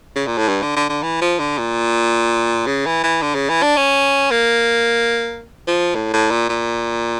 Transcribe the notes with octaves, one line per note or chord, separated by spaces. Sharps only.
C#3
A#2
A2
G2
D3
D3
D3
E3
F3
D3
A#2
C#3
E3
E3
D3
C#3
E3
D4
C#4
A#3
F3
A2
A2
A#2
A#2